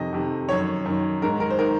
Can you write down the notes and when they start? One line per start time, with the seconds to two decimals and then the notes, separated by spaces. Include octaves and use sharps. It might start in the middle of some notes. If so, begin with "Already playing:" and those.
Already playing: F2 C3 D#3 D#5
0.13 F2 C3 D#3
0.49 F#2 D#3 C#5
0.86 F#2 D#3
1.22 G#2 D#3 A#4
1.40 A#4
1.50 C5
1.59 D#3 A#4